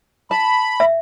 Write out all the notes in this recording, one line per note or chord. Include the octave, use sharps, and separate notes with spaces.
A5 B5
E5